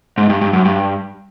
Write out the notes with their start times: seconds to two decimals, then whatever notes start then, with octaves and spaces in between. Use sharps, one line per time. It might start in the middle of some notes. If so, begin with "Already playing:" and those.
0.18 G#2
0.29 G2
0.41 G2
0.53 F#2
0.65 G2